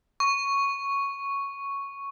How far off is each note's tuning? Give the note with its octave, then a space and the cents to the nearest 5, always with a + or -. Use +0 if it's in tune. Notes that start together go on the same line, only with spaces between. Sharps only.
C#6 +0